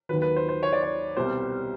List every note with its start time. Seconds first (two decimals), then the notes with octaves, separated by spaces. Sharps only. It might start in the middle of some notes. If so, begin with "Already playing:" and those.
0.09 D#2 D#3 F#3 B4
0.22 B4
0.36 C5
0.49 C5
0.63 C#5
0.73 D5
0.83 C#5
1.17 C2 B2 G3 C5